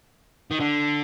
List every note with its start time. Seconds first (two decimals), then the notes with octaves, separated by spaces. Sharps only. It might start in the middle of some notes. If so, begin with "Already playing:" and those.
0.51 D#3
0.60 D3